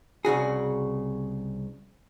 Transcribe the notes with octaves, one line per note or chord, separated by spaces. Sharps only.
C2 C#3 F#4 G#4